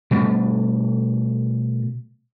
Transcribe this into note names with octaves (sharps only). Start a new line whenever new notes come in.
B2 G3 A3